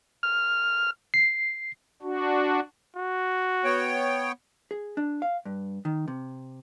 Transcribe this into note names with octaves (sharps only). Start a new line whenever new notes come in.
F6
C7
D4 F#4
F#4
B3 C#5 G5
G#4
D4
F5
G2
D#3
C3